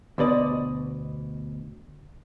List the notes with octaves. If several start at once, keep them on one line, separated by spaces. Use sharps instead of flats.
D2 B2 D5 D#5